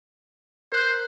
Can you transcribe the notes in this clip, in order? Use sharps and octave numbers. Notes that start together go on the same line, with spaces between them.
A#4 C5 F#6 G6